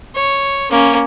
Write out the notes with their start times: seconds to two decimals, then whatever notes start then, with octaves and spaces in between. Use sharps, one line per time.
0.15 C#5
0.71 A#3 C#4